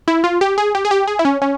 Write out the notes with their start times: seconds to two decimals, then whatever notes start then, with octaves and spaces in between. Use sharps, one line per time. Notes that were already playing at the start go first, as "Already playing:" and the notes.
0.08 E4
0.24 F4
0.41 G4
0.58 G#4
0.75 G4
0.85 G#4
0.91 G4
1.08 G#4
1.19 E4
1.25 C#4
1.42 C#4